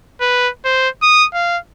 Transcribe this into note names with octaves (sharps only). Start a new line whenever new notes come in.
B4
C5
D#6
F5